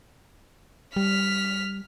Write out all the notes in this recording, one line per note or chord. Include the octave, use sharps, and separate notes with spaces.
G3 F6 B6